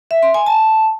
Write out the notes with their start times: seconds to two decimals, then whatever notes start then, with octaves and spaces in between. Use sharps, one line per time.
0.11 E5
0.23 C6
0.34 G#5
0.46 A5